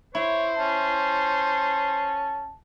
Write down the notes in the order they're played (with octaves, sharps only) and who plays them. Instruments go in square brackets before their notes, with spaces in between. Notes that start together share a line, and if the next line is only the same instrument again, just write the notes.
[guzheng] E4 [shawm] C5 [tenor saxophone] C#5
[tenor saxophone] C#4 [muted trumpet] A5